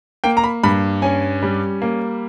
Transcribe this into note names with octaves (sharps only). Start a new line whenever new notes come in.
A#3 G5
A#5
B5
G2 B5
C#4 G#5
G3
A#3